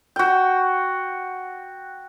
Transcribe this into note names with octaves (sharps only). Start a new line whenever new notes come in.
F#4 G5